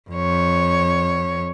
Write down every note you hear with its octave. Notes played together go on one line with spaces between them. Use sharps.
F2 C#5